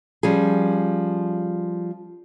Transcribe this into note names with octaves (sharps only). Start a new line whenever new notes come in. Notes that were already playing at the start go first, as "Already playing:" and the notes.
F3 G3 C#4 G#4